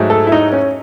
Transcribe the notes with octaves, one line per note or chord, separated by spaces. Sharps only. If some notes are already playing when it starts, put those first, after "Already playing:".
Already playing: G#2 F#3 A3
A4
E4
D#4
C#4